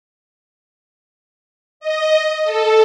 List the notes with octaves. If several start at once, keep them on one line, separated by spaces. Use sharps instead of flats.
D#5
A4